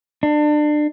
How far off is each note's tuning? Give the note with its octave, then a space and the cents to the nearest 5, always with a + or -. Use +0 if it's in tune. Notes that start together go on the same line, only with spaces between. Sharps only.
D4 +30